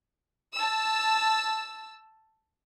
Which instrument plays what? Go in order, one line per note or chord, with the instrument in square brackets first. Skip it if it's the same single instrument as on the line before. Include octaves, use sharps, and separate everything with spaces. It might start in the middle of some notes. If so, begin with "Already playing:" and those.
[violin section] A5 E6